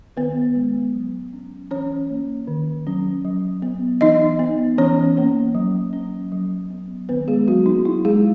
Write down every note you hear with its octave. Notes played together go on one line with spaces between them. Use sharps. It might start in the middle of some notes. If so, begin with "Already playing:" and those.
D#3 B3 B4
G#3 B3
F#3
C#4
E3 C#4 C#5
A#3 C#4
D#3
F#3 C#4
F#3
B3
E3 D#4 D#5
B3
E3 C#4 C#5
A#3 C#4
F#3
C#4
F#3
B3
D#3 B3 B4
G#3 G#4
F#3 A#3 C#4 F#4
D#4
F#3 E4
G#3 G#4